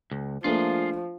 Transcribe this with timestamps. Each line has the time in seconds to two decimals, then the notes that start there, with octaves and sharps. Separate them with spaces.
0.11 C#2
0.44 F3 A3 A#3 D4 F4 G#4